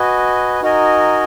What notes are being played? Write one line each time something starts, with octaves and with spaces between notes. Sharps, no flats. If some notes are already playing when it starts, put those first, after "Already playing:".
Already playing: F#4 B4 D#5 G#5
D#4 F#4 A#4 D#5 G#5